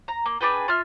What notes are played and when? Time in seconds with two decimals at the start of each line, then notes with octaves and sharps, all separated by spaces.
0.08 A#5
0.26 A#3
0.41 D4 G#4 B4 G5
0.68 F4 E5 F6